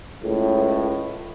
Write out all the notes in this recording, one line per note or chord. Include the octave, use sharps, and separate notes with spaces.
C#2 A2